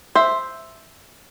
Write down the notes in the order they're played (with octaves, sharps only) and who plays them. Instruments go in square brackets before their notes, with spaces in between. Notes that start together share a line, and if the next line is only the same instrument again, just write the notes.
[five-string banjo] C5 E5